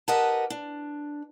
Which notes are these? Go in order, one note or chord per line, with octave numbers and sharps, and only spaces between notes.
G4 A#4 B4 D#5 F#5 A5
D4